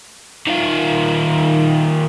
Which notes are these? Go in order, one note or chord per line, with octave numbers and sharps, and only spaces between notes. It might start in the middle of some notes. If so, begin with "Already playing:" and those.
D#3 F4